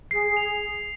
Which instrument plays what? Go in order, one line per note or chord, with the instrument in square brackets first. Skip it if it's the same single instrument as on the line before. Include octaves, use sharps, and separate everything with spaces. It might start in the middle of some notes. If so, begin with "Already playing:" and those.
[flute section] G#4 [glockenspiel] C7
[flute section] G#4
[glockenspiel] F7